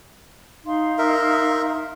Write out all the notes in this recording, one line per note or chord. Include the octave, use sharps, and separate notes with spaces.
D#4 F5 C6
A#4 E5